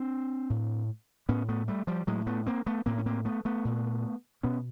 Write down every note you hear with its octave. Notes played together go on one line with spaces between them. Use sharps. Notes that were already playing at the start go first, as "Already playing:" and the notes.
Already playing: C4 D4
A2
A2 B3 C#4
A3 B3
G3 A3
F3 G3
A2 F#3 G#3
A3 B3
A#3 C4
A3 B3
A2 A#3 C4
C#4
A#3 C4
A3 B3
A3 B3
A#2
B2 B3 C#4